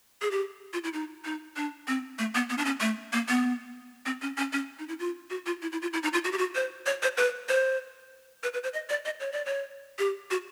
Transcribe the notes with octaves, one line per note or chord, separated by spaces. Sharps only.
G#4
G4
F4
E4
D#4
D#4
D4
C4
A3
B3
B3
D4
C#4
A3
A#3
B3
C4
C#4
C#4
C#4
D#4
E4
F4
F#4
F4
E4
E4
F4
E4
D#4
F4
F#4
G4
F#4
C5
C#5
C5
B4
C5
B4
B4
C5
D#5
D5
D#5
C#5
D5
C#5
G4
F#4